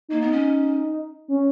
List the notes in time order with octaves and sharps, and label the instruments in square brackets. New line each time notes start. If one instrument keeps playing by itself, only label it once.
[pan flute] A#3 [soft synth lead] D#4
[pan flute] B3
C#4
[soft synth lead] C#4